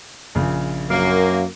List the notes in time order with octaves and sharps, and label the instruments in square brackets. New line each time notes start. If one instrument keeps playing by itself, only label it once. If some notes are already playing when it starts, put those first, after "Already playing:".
[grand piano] A#1 C#3
[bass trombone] F#2 [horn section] A#3